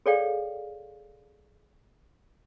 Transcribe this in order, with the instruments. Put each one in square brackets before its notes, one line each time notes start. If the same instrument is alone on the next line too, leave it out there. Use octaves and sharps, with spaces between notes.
[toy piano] G#4 A4 C#5 D5 F5 G5